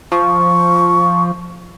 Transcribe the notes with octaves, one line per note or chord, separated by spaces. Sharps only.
F3 C#6